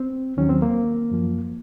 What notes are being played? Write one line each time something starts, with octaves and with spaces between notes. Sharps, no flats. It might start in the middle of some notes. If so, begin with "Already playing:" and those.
Already playing: C4
D#2 D#3 F#3 C#4
C4
A#3
F#2 F3